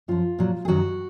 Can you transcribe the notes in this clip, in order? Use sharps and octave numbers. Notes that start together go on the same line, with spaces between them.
F#2 F3 F4
A#2 F#3
G#4
F#2 D#3 F#3 F#4